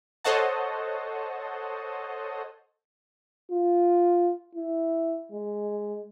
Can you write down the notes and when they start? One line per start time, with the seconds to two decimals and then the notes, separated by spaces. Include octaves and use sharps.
0.24 A4 C5 C#5 D#5 F#5 A5
3.52 F4
4.55 E4
5.32 G#3